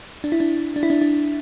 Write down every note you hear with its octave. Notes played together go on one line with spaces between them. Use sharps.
D4
E4
D4
D4
E4
D4
D4